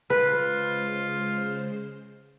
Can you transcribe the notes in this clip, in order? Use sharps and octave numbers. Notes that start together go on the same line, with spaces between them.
C#3 G#3 F4 B4 C5